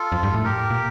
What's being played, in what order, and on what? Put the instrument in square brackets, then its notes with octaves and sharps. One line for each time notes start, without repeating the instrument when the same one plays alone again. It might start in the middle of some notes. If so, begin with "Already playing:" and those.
Already playing: [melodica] F4 A4
[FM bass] F2
G2
A2
[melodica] G4 A#4
[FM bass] A#2